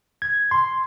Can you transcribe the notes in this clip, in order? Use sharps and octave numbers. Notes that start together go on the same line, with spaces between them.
G#6
C6